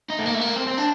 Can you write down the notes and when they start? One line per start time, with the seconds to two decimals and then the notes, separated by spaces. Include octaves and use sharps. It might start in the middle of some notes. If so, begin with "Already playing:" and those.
0.10 D#4
0.18 A3
0.25 A#3
0.34 A3
0.41 A#3
0.56 C4
0.66 C4
0.77 D4